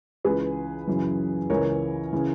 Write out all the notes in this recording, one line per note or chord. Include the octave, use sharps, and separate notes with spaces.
C#2 C#3 E3 G#4 B4
F#2 C#3 E3
C#2 C#3 E3 A#4 C#5
C#3 E3